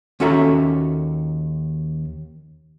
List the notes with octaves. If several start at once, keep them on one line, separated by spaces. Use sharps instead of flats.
D#2 C#4 F#4 A4 E5 A#5